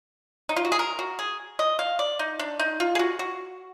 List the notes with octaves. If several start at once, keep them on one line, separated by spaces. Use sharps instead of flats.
D#4
F4
F#4
G#4
A#4
F#4
G#4
D#5
F5
D5
D#4
D4
D#4
F4
G#4
F#4
F#4